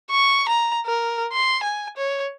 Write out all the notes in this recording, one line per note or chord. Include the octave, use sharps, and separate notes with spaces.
C#6
A#5
A#4
C6
G#5
C#5